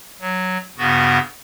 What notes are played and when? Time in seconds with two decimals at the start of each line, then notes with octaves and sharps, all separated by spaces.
0.21 F#3
0.78 G2 C#3 B3 F#4